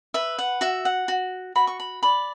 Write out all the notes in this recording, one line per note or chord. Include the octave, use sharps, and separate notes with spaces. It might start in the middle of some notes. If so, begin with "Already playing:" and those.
B4 E5
F#5
F#4 E5
F#5
F#4
F#4 B5
C#6
B5
D5 B5